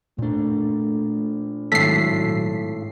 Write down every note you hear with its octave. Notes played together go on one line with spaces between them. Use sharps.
A#2 A3 D4
G#1 A2 F#3 A4 B6 C7